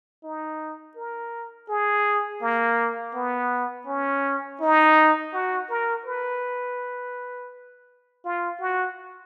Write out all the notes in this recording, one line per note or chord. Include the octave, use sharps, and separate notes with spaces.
D#4
A#4
G#4
A#3
B3
C#4
D#4
F#4
A#4
B4
F4
F#4